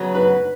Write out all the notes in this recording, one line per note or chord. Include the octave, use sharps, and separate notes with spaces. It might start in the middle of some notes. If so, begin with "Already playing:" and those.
Already playing: C#3 F#3 B3 F#4
B4